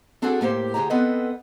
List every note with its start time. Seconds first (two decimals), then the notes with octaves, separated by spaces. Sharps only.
0.22 C4 D4 F#4 G#4 A4 G#5
0.41 A2 A#3 G4 C5
0.74 D2 C3 G4 G#4 A#5
0.90 B3 C4 A4 B4 D#5